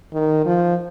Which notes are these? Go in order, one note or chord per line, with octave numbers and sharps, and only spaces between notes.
D#3
F3